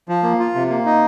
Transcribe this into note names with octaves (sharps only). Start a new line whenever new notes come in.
F3
A#3
F4
C3
A#3
D#4